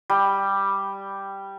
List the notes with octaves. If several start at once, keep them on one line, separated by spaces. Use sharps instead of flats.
G3